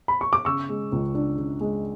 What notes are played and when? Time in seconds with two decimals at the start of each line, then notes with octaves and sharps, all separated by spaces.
0.08 B5
0.21 C#6
0.33 D6
0.45 C#3 C#6 E6
0.69 G#3
0.92 C#2
1.15 D4
1.38 C#3
1.61 G#3